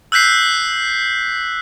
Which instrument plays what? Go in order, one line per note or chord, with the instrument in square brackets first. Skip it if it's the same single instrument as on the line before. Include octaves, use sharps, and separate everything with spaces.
[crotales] E6 F#6 G6 B6 C7